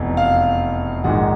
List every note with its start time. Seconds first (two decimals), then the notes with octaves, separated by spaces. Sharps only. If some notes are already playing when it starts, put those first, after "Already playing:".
Already playing: F1 E2 B2
0.17 F5
1.04 A#1 G#2 D#3 F#5